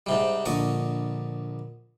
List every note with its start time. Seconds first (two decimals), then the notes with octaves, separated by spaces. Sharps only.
0.06 G#2 C3 G3
0.45 A#1 D3 D#5 C#6